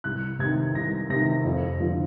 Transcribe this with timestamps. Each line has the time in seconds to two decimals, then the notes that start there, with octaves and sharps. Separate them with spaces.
0.04 C2 F#6
0.39 C3 D#3 G#6
0.75 C2 A#6
1.10 C3 D#3 A#6
1.44 F2
1.80 D3 F3